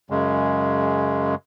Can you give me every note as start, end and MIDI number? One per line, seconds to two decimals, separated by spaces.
0.10 1.35 42
0.10 1.35 49
0.10 1.35 56